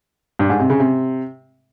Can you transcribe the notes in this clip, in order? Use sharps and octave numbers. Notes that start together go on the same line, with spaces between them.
G2
G#2
C3
C#3
C3